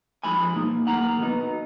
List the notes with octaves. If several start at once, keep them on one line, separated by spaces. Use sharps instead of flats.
F2 F3 G#3 D#4 G#5 B5
B2 A#3 D#4
F#2 D#3 A#3 F#5 A#5
B1 B2 F#3 B3 D#4